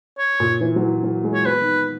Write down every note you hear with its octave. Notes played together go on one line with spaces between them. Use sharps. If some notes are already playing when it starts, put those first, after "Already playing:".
C#5
A#2
E3
F#3
E3
F#3
G#3
C#5
B3 B4
D#3